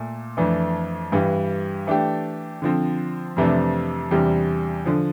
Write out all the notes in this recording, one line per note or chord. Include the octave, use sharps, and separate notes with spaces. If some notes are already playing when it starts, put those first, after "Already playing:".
Already playing: A#2 A3
F2 E3 A3 D4
G2 E3 G3
E3 A3 D4 G4
D3 F3 C4
F2 C3 E3 A3 D4
E2 C3 G3 D4
D3 F3